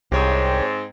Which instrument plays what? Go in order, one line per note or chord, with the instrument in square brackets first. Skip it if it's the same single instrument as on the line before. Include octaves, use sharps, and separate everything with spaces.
[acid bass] C2 [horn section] G#2 C4 [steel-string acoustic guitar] G4 C#5